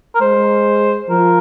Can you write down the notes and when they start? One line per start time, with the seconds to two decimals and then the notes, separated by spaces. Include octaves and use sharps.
0.15 A#4
0.21 G#3 C5
1.10 F3 A#4